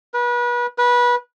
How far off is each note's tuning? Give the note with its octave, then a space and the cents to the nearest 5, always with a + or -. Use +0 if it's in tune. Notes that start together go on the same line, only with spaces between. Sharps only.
B4 -35
B4 -25